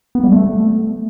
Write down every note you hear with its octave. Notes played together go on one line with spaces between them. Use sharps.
B3
G3
A3